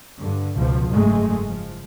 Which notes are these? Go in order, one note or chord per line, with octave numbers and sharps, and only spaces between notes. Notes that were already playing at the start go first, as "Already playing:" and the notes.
G2 D3
C#2 B2 F3
F#1 G#2 G#3 A3
F3